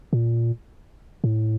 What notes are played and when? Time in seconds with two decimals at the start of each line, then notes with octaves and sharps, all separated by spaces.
0.13 A#2
1.24 A2